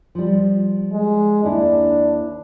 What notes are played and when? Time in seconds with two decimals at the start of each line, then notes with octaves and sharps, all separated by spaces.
0.15 F3 G3
0.93 G#3
1.44 D#2 D4 E4